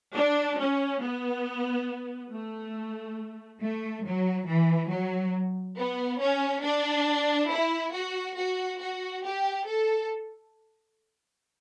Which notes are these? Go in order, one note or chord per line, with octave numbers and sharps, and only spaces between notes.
D4
C#4
B3
A3
A3
F#3
E3
F#3
B3
C#4
D4
E4
F#4
F#4
F#4
G4
A4